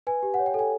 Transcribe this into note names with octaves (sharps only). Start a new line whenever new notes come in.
B4 G#5
G4
F#5
C#5
G5
A4 G#5